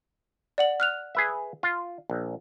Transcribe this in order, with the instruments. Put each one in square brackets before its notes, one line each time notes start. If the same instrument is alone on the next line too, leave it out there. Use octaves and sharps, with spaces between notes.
[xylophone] D5 F#5 F#7
F6 F#6 F7
[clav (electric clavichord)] G#4 B4 E5
F4
A#1